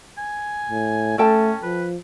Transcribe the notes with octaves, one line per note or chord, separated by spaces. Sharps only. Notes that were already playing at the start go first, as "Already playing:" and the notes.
G#5
A2
A3 C#4 A4 G5 A5
F3 B4